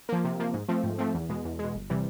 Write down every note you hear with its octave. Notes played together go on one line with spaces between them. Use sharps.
F3 A#3
C3
F3 A#3
G#2
F3 A3 C4
G#2
F3 A3 C4
E2
B2 G#3
E2
G#3
B2
G1
C3 E3 G3